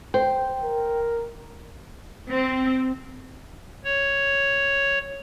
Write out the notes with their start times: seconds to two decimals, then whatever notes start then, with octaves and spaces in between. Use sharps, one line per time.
0.14 C5 G5
0.63 A#4
2.31 C4
3.84 C#5